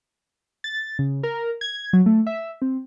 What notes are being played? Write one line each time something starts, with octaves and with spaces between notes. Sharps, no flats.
A6
C#3
A#4
G#6
F#3
A3
E5
C4